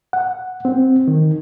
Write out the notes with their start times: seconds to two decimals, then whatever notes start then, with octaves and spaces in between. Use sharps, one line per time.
0.13 F#5
0.65 C4
1.08 D#3